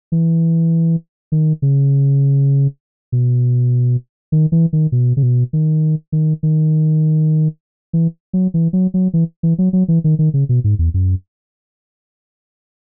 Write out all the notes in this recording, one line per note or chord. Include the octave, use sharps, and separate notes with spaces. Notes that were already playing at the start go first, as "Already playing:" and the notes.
E3
D#3
C#3
B2
D#3
E3
D#3
B2
C#3
B2
D#3
D#3
D#3
E3
F#3
E3
F#3
F#3
E3
E3
F#3
F#3
E3
D#3
D#3
C#3
B2
G#2
E2
F#2